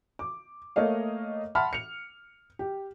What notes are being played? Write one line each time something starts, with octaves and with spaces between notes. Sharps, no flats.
D6
A3 A#3 C#5 D#5 F5
E5 F#5 A5 B5 C6 F6
C#7 F7
G4